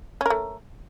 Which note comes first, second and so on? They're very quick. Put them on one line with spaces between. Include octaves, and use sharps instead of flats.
C#4 A#4 A3